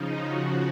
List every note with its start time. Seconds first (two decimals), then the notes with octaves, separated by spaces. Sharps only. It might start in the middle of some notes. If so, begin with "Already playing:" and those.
Already playing: C#3 F3 D#4
0.27 F#4